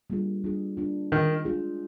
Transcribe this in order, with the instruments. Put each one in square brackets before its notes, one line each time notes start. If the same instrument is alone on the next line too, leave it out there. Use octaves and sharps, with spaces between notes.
[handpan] G3 A#3 D4 F4 G#4
G3 A#3 D4 F4 G#4
G3 A#3 D4 F4 G#4
[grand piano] D#3 [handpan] G#3 D4 F4 G#4
[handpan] G#3 D4 F4 G#4